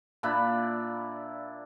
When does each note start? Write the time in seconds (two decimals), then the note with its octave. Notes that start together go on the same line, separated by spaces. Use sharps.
0.23 A#2 D4 E4 B5